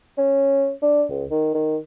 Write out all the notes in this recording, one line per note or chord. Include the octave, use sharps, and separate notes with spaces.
C#4
D4
C#2
D#3
D#3